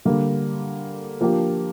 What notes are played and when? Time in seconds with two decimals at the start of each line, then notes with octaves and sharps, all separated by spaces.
0.05 D3 G3 A#3
1.21 F3 A#3 D4 G4